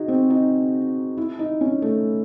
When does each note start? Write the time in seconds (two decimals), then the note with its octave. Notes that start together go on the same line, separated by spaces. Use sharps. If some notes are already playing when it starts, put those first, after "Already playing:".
Already playing: D#4 F#4 G#4
0.08 C4
0.30 D#4
1.17 E4
1.39 D#4
1.61 C#4
1.82 A3